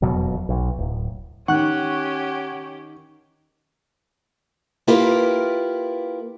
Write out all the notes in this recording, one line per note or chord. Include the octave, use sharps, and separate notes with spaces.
E1 F2 B2 F#3
B1
D1
D#3 C#4 G4 F#5 C#6 F#6
A#3 E4 F4 G4 A#4 B4